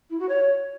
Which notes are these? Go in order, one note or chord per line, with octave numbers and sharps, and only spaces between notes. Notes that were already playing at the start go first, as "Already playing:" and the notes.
E4
F#4
C#5